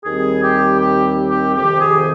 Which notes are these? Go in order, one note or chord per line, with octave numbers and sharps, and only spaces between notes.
D#2 D#3 G3 C4 G#4
G4
G4
G4
F2 C3 D#3 G4
G#4